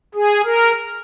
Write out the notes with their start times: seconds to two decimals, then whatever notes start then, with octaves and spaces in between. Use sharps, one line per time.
0.14 G#4
0.45 A#4